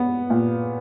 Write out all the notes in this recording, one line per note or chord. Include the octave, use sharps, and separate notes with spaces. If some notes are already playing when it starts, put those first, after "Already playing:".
Already playing: B3
A#2